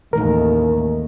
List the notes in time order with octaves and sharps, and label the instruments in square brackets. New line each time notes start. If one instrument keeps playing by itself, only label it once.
[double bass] A1 D#2 [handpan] D#3 A3 D#4 [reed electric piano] A#4